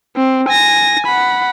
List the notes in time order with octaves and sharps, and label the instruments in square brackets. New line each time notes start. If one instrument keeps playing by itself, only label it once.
[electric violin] C4
G#5 A#6
F#5 B5